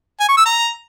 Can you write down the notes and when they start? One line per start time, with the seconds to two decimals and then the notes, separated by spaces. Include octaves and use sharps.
0.20 G#5
0.29 C#6
0.37 E6
0.45 A#5